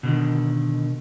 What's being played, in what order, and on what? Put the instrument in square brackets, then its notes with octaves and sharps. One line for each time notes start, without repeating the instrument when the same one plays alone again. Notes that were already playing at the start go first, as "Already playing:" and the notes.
[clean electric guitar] B2 D3 D#3